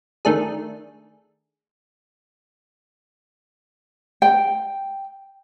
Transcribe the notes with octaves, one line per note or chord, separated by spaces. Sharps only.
D#3 A3 D4 G#4
G5